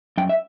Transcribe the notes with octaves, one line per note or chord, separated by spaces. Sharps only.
F#2 G5
E5